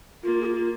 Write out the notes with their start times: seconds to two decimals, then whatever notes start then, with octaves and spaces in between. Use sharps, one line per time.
0.23 A#3 F4
0.41 G#4
0.45 F4